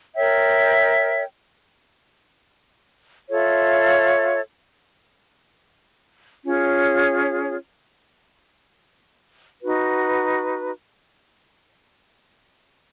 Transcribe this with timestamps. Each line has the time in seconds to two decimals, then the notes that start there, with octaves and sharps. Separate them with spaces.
0.14 A#4 C#5 E5 G5
3.29 F4 A4 C#5 E5
6.45 C#4 F4 G#4 C#5
9.61 D#4 F#4 B4